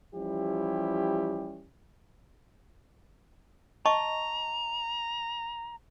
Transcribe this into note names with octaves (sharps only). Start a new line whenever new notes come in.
E3 F3 G3 C#4 E4 G4
D#5 A5 A#5 C#6